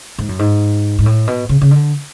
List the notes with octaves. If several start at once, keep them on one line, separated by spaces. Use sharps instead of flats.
G#2
F#2
G#2
G#2
A2
B2
C#3
C#3
D3